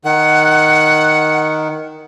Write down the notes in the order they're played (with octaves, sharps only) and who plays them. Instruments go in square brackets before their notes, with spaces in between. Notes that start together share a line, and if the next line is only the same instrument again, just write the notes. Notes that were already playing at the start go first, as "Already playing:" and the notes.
[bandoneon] D#3 [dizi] F#5